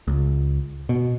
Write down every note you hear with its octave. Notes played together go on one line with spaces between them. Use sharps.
C#2
B2